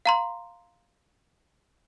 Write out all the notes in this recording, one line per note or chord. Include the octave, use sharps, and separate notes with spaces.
F5 A#5 C6